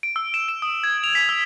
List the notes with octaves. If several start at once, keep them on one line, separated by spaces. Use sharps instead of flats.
D7
E6
E7
E7
D#6
G#6
F7
B6
E6